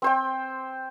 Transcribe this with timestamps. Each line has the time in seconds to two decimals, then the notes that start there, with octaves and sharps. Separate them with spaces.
0.02 C4 C5 G5